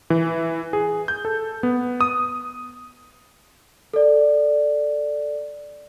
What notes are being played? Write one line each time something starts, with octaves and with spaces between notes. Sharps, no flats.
E3
G#4
G6
A4
B3
D#6
A4 D5